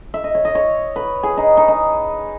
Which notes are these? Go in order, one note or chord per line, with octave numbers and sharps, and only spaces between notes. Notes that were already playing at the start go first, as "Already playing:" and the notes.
E5
D#5
C#5
D#5
C#5
B4
G#4
D#4
D#4
D#4